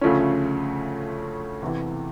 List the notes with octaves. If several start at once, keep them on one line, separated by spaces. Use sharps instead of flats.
D2 C#3 F3 A3 C#4
E2 C3 E3